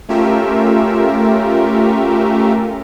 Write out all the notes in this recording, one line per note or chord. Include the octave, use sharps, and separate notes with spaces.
A3 C#4 F4 G4 A#4 E5